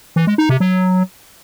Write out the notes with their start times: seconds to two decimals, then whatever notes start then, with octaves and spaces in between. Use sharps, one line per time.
0.16 E3
0.27 G#3
0.38 D#4
0.49 C3
0.60 F#3